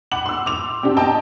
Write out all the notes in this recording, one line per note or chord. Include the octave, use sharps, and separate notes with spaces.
F#5 B5 D6 F#7
C6 E6
D6 F7
C4 D4 G4
D#5 G5 A5 A#5